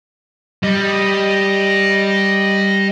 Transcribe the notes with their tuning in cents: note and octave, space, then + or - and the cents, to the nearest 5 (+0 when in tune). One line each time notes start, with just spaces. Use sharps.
G3 +0 D#5 +0